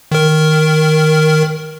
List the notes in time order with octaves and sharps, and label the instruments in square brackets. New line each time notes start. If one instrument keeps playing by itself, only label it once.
[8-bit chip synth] D#3 A#4